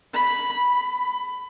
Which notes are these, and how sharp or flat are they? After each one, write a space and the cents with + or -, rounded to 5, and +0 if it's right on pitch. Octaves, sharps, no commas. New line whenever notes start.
B5 -5
B5 +20